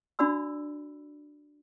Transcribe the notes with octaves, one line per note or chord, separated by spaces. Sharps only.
D4 F#4 D5 B5 E6